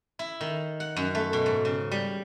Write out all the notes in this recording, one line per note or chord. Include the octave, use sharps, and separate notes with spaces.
E4
D#3
F#5
F#2
A3
B2
G#2
C#3
G3